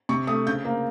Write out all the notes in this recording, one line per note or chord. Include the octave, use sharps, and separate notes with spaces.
C3 C#6
A3 D#6
C#3 G6
A#3